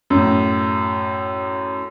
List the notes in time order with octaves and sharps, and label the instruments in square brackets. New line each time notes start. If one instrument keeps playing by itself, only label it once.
[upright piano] F#2 A2